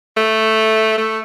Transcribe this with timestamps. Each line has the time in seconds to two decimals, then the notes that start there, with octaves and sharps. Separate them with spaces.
0.17 A3
0.98 A3